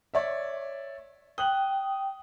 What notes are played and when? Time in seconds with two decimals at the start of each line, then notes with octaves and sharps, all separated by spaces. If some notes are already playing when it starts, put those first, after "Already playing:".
0.14 C#5 D5 E5
1.38 G5 D#6 F#6 F#7